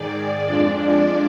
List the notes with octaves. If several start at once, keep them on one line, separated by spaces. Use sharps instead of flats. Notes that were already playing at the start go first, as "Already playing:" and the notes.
Already playing: G#2 D#3 G#3 D5
F2 F3 G#3 D4 D5
D5